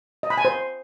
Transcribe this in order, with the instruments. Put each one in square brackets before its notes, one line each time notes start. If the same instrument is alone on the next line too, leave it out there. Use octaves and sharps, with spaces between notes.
[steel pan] D#5
B5
G#5
C5